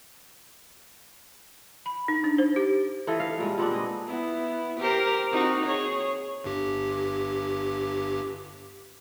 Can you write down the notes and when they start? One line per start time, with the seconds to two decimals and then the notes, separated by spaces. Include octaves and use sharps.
1.86 B5
2.08 D#4
2.24 D4
2.38 C5
2.56 G4
3.07 E3 F4 A4 D#5
3.20 F5
3.38 A#2 G3 G#3
3.58 A#2 B3 C4 D4
3.73 G#4 D#5
4.07 B3 E4
4.79 G4 A#4 C5
5.31 C4 D#4 F#4
5.65 G#4 C#5
6.44 G1 G2 G4